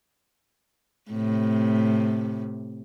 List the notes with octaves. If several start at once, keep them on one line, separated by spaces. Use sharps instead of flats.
A2 C3